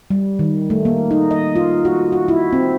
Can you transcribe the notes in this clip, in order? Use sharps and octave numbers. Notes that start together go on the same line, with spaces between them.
G3
D#3
A3
A#3
D#4
D#5
F4
F#4
F#4
E4
C4